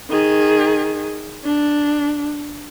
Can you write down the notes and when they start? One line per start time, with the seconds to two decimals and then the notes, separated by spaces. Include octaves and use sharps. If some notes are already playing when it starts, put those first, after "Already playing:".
0.10 D#3 G#4
1.44 D4